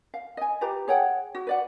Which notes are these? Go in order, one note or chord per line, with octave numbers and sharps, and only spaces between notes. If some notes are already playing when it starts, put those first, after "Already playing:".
F5
D#5 G#5
F4 G4 B4 A#5
G#4 C#5 F#5 G5
F#4
B4 D5 F#5